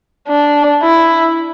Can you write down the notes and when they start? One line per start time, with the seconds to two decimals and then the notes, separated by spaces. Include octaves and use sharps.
0.28 D4
0.82 E4